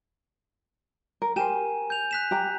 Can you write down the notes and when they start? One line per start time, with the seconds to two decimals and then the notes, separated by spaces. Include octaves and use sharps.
1.22 A#4
1.36 G4 A#4 C5 G#5 D#7 E7
1.90 G6 F7
2.11 F#6 B6 E7
2.31 G4 A#5